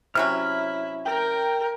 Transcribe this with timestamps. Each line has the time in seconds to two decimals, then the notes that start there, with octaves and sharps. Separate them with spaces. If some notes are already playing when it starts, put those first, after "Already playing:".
0.15 C3 F#3 C#4 E4 F6
1.05 A#4 G5